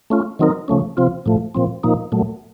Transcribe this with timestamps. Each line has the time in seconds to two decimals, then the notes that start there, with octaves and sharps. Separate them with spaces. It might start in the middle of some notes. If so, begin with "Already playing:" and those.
0.10 A3 C#4 F4
0.39 D#3 F#3 C4 D#4 A#4
0.68 C#3 F3 A3 C#4
0.97 C3 F3 C4 F4
1.26 A2 F3 A3
1.55 A#2 F3 C4
1.83 A#2 F3 A#3 D#4
2.12 A#2 F#3 A3